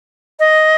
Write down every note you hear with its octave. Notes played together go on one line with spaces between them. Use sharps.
D#5